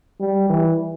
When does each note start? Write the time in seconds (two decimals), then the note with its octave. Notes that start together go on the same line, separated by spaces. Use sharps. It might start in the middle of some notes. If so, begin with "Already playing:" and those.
0.20 G3
0.49 E3